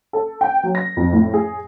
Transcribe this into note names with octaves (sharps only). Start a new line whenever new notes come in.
A4
G5
F#3
A#6
F2
A2
G#4